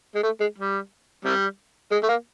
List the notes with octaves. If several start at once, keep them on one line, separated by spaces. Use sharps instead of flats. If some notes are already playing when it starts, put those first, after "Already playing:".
G#3
A3
G#3
G3
C3 G3
G#3
A3
A#3